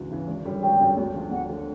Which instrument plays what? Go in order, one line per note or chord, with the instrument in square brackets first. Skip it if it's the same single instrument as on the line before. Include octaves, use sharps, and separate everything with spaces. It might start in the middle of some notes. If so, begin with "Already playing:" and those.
Already playing: [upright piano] D2 C#3 E3
C#3 E3
G#1
F#2 D3 G3
[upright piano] G#1 [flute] G5
[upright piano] F#2 D3 G3
D2
D3 F3
[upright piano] D2 [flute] F#5
[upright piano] D3 F3